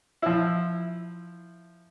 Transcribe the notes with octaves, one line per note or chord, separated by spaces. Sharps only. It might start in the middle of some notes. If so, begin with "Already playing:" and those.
F3 E4